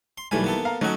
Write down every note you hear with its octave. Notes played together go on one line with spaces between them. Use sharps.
C6
B1 D#3 E3 G3 A3 G#5
A#3 B3 A4
F5 A#5
F#3 A3 C#4 D#4 F#4